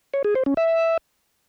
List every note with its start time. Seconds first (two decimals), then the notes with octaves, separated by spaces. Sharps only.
0.14 C#5
0.24 G#4
0.35 C5
0.46 C#4
0.57 E5